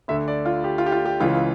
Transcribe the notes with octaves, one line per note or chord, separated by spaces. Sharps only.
D2 D3 E5
D5
F4
G4
F4
G4
F4
G4
C#2 C#3 E3 F4